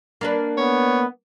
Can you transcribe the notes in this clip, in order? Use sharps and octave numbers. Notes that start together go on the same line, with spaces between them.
A#3 D4 B4
B3 C#5